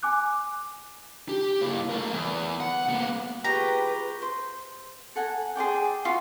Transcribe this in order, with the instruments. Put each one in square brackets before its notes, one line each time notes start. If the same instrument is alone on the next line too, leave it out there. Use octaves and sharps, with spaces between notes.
[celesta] G#5 D6 F#6
[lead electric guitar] G4
A#3 E4
A3 A#4
E2
F#5
A#3 B3
[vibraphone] F4 G#4 C#6 [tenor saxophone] G4 [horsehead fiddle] B4 [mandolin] A#5
[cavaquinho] C5
A4 F#5 G#5 A#5
G#4 C5 D5 G5
F4 F#4 E5 F5